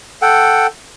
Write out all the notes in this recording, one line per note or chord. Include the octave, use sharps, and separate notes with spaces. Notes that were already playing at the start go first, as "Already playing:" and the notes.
A4 F#5 G5